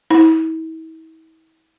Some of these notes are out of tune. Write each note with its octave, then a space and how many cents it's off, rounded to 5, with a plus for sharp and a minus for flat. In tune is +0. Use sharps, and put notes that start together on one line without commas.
E4 -40